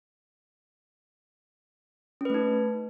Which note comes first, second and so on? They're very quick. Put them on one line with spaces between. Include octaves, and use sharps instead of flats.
C#4 B4 A3 D#4